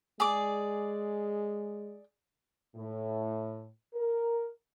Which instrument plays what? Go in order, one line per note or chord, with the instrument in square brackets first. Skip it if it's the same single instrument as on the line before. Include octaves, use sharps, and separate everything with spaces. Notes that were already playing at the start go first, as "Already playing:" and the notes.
[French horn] G#3 [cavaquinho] G#4 D5 D6
[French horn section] A2
A#4